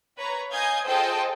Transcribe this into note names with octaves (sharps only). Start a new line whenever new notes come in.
B4 C#5 A#5
D#5 F5 G#5 D#6 G6 G#6
F4 G#4 A4 C5 D#5 G5